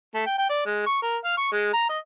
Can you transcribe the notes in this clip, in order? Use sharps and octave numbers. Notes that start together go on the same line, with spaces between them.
A3
G5
G5
D5
G#3
C#6
A#4
F5
C#6
G#3
A#5
D#5